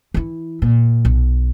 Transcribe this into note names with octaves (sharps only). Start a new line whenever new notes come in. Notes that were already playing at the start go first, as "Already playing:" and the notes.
E3 E4
A#2
B1